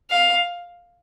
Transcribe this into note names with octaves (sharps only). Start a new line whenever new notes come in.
F5